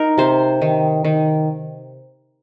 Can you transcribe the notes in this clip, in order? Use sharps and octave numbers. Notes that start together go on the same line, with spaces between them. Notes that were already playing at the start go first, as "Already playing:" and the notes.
Already playing: D#4 A#4
C3 C5
D#3
D#3